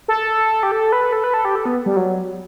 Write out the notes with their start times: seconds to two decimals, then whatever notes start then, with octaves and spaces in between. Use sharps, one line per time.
0.08 A4
0.63 G4
0.72 A4
0.92 B4
1.13 A4
1.24 B4
1.34 A4
1.45 G4
1.55 A4
1.65 B3
1.86 G3
1.96 F#3